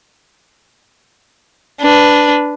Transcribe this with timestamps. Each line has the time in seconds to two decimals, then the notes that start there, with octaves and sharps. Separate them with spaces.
1.81 D4 B4